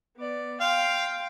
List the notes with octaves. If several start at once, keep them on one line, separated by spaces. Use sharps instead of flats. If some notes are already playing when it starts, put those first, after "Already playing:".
B3 D5
F5 G5 C6